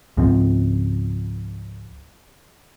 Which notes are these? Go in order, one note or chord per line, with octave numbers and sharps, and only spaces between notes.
C#2 G#2 F3 C4